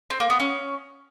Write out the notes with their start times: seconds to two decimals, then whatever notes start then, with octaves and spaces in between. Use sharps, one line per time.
0.10 C4
0.20 A#3
0.30 B3
0.40 C#4